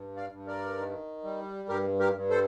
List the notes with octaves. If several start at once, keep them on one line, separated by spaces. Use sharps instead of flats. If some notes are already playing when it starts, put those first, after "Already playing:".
Already playing: G2
D5 F5
G2
A#4 D5
D#3
G3
G2 G4 A#4
G4 A#4
G2
A4 C5